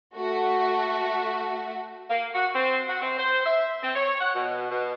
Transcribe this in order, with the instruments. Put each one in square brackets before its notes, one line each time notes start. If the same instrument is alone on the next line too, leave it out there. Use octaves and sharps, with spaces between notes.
[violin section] A3 F#4
[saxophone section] A#3
F#4
C4
F#4
C4
C5
E5
C4
C#5
F#5
B2
B2